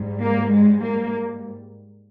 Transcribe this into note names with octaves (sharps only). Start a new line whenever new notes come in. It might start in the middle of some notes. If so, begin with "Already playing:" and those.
Already playing: G#2 G3
A#3
G#3
A#3